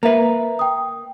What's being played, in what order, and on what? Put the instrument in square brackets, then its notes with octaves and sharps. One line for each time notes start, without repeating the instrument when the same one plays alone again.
[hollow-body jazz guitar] A#3 B4 [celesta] E5 A#5
[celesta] G5 D#6